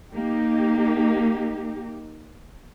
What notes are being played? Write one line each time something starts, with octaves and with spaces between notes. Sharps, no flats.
A#3 D#4 G4